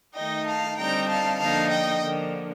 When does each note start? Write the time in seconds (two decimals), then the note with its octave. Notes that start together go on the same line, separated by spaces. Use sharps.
0.14 D#3 A3 D#4 D#5 G5
0.46 F5 A5
0.77 D3 G3 C4 D#4 G5 A#5
1.09 F5 A5
1.39 D3 F3 A#3 D#4 F5 A5
1.71 D#5 G5
2.02 D3 F3 A#3